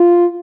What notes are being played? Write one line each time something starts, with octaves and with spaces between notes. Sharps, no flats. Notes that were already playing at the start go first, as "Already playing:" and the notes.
Already playing: F4